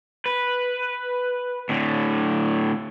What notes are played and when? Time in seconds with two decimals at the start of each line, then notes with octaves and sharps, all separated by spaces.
0.26 B4
1.69 A2 D3